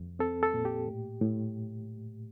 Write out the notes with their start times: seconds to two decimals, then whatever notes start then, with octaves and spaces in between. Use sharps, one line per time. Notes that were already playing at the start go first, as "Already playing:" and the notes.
Already playing: F2
0.19 C4 A4
0.43 A4
0.54 A#2
0.65 G4
0.88 A2
1.22 A2